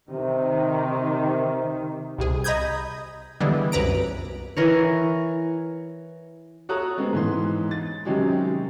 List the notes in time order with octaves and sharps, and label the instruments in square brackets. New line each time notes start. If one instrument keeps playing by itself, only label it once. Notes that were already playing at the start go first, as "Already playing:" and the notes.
[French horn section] C3 [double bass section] D#3
[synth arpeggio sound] C2 C3 G#4
D#5 A#5 B5 D#6 G6 G#6
D3 E3 G3 G#3 B3 D4
C2 F#2 B4 A#5 D7
[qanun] E3 A#4 C#5
[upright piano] F#4 A4 C#5 A#5 D#6 F#6
G#3 B3 C4
G#2 E3 C6
A6
C3 D#3 F#3 G#3 C#4 G4